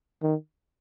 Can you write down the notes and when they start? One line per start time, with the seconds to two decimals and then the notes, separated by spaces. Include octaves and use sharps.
0.23 D#3